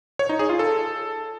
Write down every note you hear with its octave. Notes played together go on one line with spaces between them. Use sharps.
C#5
D#4
G#4
F4
A4